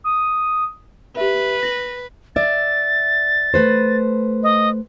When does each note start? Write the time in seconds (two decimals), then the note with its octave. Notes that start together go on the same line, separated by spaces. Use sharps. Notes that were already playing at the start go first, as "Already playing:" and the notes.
0.04 D#6
1.17 G4 B4 E5
1.63 A#6 F#7
2.36 D5 E5 A6
3.54 A3 B4 C5
4.43 D#5